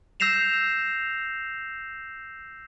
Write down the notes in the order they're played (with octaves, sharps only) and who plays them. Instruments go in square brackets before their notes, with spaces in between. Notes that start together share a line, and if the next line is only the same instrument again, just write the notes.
[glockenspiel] E6 G6 A#6 C7 E7 F7